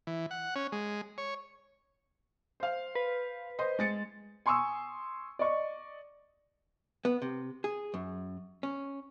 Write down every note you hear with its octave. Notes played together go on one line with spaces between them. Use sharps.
E3
F#5
C#4
G#3
C#5
C5 F5
B4
C5 D#5 C6
G#3 A6 C#7
G#5 C6 C#6 D#6 E6
D5 D#5 C#6
B3
C3
G#4
F#2
C#4